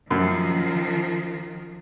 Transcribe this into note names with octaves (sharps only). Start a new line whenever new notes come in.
F#2 D#3 F3